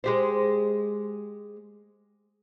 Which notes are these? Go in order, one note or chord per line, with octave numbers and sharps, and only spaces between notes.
G#3 G4 C5